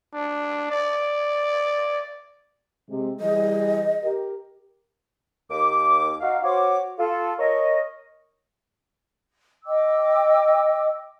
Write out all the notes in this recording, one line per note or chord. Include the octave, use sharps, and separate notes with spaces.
D4
D5
C3 G#3
E3 G3 G#4 D#5
G4 A#4
D#2 D6
D#4 F#4 F5
F#4 C5 C#5 D6
F4 A4
A#4 C#5 D#5
D#5 G5 D6 E6